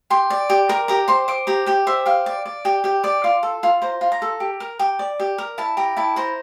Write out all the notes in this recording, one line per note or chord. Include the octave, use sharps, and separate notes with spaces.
G4 C6
D5
G4
A#4
G4 A#5
C5 C6
C5 D6
G4 A#5
G4 G5
C5 E5
G4 F5
D5
D5
G4 G5
G4 G5
D5 D6
F4 C6
A4
F4
C5 A#5
F4
A#5
A4
G4
A#4
G4
D5
G4
A#4
E4 A5
G4 A#5
E4 A5
C5 A#5